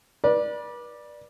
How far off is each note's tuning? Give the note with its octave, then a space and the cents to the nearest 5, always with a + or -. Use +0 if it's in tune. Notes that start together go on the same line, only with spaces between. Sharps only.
B4 -35 D5 +10